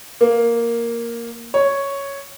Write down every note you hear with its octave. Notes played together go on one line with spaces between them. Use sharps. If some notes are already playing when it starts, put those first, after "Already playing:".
A#3
C#5